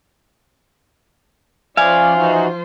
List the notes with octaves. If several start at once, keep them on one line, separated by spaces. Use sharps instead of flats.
F3 C#4 F4 C5 D5 E5 F5 G#5
E3 D#4 F#4